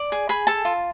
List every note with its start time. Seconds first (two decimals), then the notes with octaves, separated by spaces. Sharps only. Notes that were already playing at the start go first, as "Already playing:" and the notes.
Already playing: D5
0.12 G#4
0.29 G#4 B5
0.47 A4 A5
0.65 F4